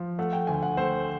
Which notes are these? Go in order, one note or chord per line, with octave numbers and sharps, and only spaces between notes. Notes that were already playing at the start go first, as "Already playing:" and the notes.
Already playing: F3
A3 F#5
G5
D2 G#5
F#5
A3 C5